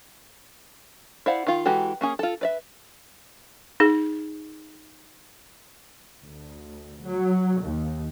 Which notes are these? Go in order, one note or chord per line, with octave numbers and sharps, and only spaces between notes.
E4 C5 D5 F5 F#5
D#3 F4
E3 G#3 F#4 G4 A4
A#3 C#4 G#4
F4 A4
B4 D5 E5
D#4 G#4
D2
F#3
D#2